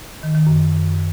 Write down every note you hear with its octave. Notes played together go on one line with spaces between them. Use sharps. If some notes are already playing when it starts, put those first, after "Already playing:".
D#3
D#3
F#2